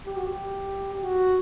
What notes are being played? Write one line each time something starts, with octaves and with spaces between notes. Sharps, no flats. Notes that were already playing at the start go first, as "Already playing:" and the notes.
G4
F#4
G4
G4
F#4